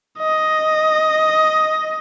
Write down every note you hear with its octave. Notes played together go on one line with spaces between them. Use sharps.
D#5